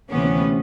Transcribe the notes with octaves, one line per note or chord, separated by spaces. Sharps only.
D2 C3 E3 B3 C#4